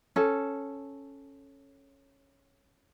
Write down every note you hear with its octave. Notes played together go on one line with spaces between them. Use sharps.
C#4 A4